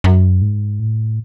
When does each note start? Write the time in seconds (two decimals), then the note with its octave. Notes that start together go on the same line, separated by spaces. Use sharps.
0.04 F#2
0.42 G#2
0.80 A2